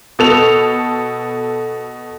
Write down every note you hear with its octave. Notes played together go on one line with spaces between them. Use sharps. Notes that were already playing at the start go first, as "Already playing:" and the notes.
B2 A4 F7